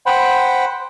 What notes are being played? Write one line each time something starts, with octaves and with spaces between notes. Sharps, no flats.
C5 F#5 G5 B5